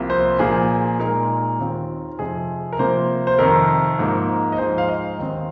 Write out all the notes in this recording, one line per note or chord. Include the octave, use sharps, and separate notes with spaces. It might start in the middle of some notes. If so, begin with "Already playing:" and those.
Already playing: C2 C3 F3 A#3
C5
A#2 F3 A#3 G#4
A#2 G#3 D#4 A#4
D#2 D#3 C4 F4
F2 C3 F3 G#4
A#4
C3 F3 A#3 C5
C5
F2 C3 D#3 A#4
G#2 F3 A#3 D#4
D#5
G#2 F3 G#3 D#4 C5
F5
D#5
D#2 D#3 C4